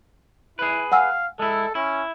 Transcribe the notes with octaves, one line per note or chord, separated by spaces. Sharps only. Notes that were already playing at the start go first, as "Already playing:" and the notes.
E4 G#4 B4
F5 F#5 G#5 E6
G#3 E4 A4
C#4 E4